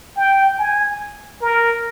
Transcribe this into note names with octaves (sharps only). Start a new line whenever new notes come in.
G5
G#5
A#4